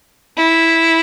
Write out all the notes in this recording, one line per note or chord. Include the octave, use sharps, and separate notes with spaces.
E4